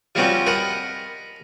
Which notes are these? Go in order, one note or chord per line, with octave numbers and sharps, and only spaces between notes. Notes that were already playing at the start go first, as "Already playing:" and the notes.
F3 G3 C4 C#4 F#4 C5
A#4 D#5 F#5 A5 B5